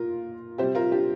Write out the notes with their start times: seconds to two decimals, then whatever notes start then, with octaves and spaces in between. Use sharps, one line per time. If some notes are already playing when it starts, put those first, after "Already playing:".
Already playing: A#2 F4 A#4
0.58 C3 G3 G4 C5
0.75 F4 A#4
0.91 D4 G4